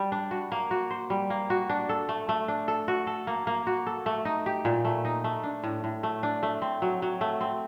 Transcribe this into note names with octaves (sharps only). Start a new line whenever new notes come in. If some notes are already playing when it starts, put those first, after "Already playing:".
Already playing: G3
D4
F#4
A#3
F#4
C5
G3
A#3
F#4
D4
A4
A3
A3
D4
A4
F#4
A4
A#3
A#3
F#4
A4
A3
D#4
G4
A#2
A3
D#4
A3
D4
A2
A2
A3
D4
A3
C4
F#3
F#3
A3
C4